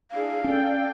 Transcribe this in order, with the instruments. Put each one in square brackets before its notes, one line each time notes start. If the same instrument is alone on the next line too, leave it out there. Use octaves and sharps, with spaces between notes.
[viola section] D4 E4 G#4 [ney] F5
[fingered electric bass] C#4 [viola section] A4 D5 G5